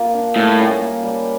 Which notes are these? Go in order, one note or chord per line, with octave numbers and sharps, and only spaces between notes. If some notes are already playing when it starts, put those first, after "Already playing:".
Already playing: A#3 F4
D4
A2 G3
C#4
A#3
G3